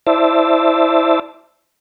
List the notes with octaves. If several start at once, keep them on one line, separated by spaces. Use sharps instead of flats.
E4 C5 D5 E5 A5